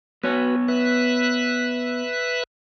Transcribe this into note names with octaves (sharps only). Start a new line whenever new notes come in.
B3 F#4 B4 C#5
B4 E5 F#6